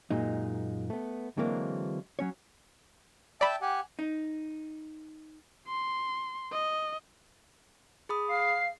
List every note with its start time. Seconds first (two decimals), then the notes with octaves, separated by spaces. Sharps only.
0.11 F#2 A#2 G#3 D#4
0.90 A3 B3
1.37 D3 E3 F#3 G#3 A#3 C4
2.19 F#3 C#4 C#5
3.41 D5 E5 G5 A5 B5
3.62 G4 F#5 G#5
3.99 D#4
5.67 C6
6.52 D#5
8.09 G#4 B5 D#6
8.29 F5 C7